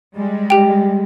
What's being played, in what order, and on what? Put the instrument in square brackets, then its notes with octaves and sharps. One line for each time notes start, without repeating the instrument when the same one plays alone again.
[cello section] G3 G#3
[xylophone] G4 G5